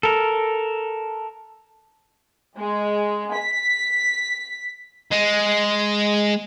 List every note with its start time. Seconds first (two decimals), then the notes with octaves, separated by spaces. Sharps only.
0.03 A4 A#4
2.58 G#3
3.36 B6
5.12 G#3